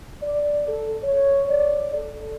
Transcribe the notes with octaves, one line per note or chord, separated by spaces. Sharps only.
D5
A4
C#5
D5
A4